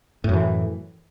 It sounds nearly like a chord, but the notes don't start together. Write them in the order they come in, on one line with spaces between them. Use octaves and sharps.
A2 F#2 E3